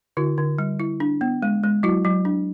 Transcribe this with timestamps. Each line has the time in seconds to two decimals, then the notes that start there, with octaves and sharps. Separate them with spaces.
0.17 D3 E4 F#4
0.38 D3
0.59 G3
0.80 E4
1.00 D4
1.21 B3
1.42 G#3
1.63 G#3
1.83 F#3 E4 F#4
2.05 F#3
2.25 D4